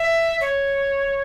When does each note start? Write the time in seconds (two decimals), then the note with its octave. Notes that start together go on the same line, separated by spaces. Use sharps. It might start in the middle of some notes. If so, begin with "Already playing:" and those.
Already playing: E5
0.41 C#5